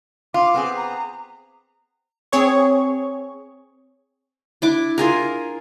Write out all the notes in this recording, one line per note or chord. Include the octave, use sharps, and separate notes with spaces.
F4 D6
B3 C4 G#4
A#5
C4 G#4 C#5 C#6
D4 E4 D6
F4 G#4 A#4